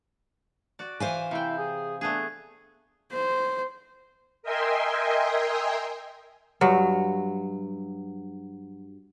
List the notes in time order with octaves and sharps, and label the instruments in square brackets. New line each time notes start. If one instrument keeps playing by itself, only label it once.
[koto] F#4 D5
[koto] E3 [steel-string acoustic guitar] C5 F5 G#5
[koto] C3 G5 [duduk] E4
[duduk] G#4
[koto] A3 B3 G#4 [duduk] D4
[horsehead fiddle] C5
[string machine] A#4 D#5 E5 G5 G#5 C6
[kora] G2 F#3